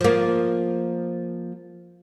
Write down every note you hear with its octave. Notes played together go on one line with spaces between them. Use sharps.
F3 A#3